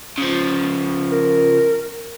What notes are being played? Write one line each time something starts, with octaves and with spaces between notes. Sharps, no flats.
C#3 F3
A#4